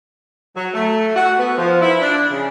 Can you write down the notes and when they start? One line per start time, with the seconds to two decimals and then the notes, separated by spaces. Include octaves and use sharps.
0.57 F#3
0.74 A3
1.16 F#4
1.39 B3
1.58 F3
1.82 E4
2.01 D4
2.31 C#3